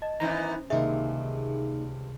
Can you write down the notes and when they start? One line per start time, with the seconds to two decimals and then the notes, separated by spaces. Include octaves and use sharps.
0.02 D#5 A5
0.20 D#3 E3 B3 C#4 C5 A#5
0.70 C#2 G2 C3 D#3 A#3 D#4 G#4 E5